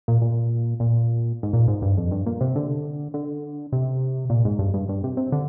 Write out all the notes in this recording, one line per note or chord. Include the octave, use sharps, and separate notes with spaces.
A#2
A#2
A#2
G#2
A#2
G#2
G2
F2
G2
A#2
C3
D3
D3
C3
A#2
G#2
G2
G2
G2
C3
C3
D3